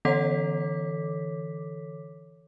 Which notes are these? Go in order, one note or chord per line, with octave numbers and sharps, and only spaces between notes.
D3 E3 A4 C#5 D6 B6